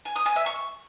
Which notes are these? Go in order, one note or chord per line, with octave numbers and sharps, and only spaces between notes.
G#5
D#6
G#5
E5
C#6